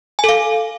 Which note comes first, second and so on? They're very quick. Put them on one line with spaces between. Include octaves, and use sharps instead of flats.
G#5 A4 F5